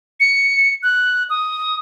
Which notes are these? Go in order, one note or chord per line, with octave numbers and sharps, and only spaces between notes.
C#7
F#6
D#6